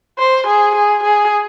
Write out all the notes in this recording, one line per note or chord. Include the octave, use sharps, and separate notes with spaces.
C5
G#4
G#4
G#4